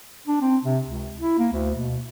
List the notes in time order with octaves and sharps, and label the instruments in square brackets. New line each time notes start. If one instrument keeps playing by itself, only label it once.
[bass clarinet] D4
C4
C3
C#2
E4
A#3
D2
B2